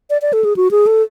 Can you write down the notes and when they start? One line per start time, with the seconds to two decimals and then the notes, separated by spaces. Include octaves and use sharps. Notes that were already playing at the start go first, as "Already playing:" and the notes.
0.10 D5
0.22 D5
0.33 A4
0.44 G#4
0.56 F#4
0.71 G#4
0.87 A4